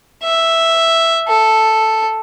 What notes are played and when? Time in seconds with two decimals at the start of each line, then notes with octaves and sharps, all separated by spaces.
0.24 E5
1.29 A4